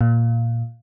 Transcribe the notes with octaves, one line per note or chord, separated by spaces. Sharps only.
A#2